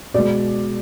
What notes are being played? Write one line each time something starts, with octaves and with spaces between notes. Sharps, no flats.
B2 G#3 D5